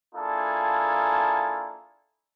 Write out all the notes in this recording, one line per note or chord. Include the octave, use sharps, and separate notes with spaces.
A#3 D4 E4 F4 G#4 A4